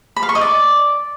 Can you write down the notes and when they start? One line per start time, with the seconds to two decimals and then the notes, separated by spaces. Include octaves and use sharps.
0.16 B5
0.23 F5
0.29 C#6
0.35 D#5
0.41 D5